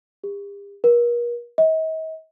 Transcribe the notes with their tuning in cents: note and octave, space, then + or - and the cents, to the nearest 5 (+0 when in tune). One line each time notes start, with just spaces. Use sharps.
G4 +45
A#4 +40
D#5 +45